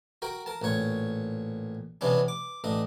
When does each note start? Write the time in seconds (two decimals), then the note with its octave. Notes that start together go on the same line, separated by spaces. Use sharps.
0.22 F#4 A#4 G5
0.46 A#4 A5
0.62 A1 A#2 C#5 C#6
2.01 C3 E3 B3 C#4 D4
2.28 D6
2.64 A1 D4 D#5